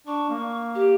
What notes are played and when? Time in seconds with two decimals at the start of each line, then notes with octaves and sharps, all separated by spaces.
0.07 D4 C#6
0.30 A#3
0.75 G4